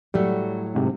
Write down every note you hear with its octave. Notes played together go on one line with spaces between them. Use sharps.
A2 F#3 G3 A3
G#2 C3